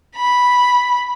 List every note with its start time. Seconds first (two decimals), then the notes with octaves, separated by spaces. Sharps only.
0.16 B5